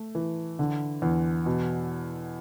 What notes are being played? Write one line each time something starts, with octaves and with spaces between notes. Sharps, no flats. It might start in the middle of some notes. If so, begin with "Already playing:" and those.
Already playing: A3
E3
D3
E2
B2